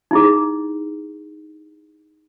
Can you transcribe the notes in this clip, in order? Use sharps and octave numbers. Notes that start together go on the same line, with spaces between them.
D#4 E4 G#4